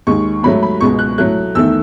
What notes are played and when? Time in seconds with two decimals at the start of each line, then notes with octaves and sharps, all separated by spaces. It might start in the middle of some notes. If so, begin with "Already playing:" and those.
0.07 D#2 D#3 G#3 C#6
0.43 G#2 F#3 A3 B5
0.63 B5
0.81 C#2 B2 G#3 C#6
0.99 F#6
1.18 A2 F#3 A3 F#6
1.55 E2 D#3 A3 E6